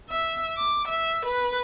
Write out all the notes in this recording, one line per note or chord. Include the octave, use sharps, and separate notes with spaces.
E5
D6
E5
B4